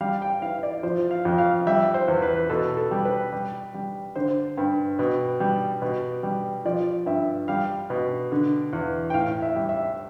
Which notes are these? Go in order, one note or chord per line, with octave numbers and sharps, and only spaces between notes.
G3 F5
G5
E3 F5
D5
F3 C5
F5
F2
F5
G3 E5
C5
E2
B4
B2 A4
A4
G3
B4
G3
G3
D3 C5
G2
B2
G3
B2
G3
F3 D5
G2 E5
G3 F5
B2
D3
E2
G5
A2 F5
E5
G3
E5